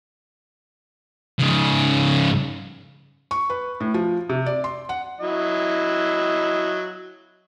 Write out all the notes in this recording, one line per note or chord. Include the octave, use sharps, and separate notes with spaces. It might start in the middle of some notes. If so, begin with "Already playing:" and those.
G#2 C#3
C#6
B4
A2
F3
C3
D5
C6
F#5
F#3 E4 D#5